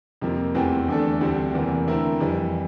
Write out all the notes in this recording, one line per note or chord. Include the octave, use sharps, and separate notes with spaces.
F2 C3 F3 A#3
E2 E3 A3 C4 G4
E2 D3 A3 D4 A4
D2 D3 G3 C4
E2 C3 E3 A#3
D3 A3 C4 E4 A#4
F2 E3 G3